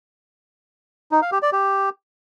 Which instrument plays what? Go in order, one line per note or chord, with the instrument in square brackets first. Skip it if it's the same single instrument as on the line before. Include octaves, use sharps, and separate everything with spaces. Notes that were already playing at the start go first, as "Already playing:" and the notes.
[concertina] D#4
F5
G4
D5
G4